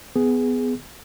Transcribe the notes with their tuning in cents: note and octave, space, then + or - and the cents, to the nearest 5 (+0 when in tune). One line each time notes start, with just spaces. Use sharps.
B3 +15 G#4 +0